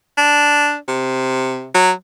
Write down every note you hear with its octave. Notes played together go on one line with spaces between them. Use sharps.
D4
C3
F#3